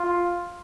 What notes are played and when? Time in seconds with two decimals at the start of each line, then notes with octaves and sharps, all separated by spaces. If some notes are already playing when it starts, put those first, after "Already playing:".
Already playing: F4